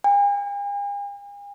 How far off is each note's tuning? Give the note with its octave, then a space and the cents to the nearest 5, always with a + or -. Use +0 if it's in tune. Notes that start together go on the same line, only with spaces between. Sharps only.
G#5 -45